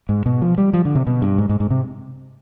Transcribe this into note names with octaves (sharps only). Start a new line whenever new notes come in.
G#2
B2
F3
G3
F3
D3
C3
B2
G2
G#2
G#2
G#2
C3